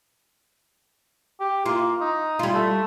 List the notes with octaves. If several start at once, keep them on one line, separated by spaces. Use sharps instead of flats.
G4
A#3 F4
D#4
G3 F4
A3